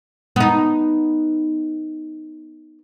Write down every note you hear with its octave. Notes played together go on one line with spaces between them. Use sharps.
B3 D#4